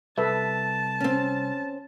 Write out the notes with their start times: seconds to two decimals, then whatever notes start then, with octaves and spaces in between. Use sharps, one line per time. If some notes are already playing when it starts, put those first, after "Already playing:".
0.18 C2 A4 B4 E5 A5
1.00 C4 C#4